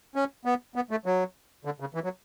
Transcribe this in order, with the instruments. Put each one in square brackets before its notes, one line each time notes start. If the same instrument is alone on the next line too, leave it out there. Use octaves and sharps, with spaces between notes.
[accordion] C#4
B3
B3
A3
F#3
D3
C#3
E3
F#3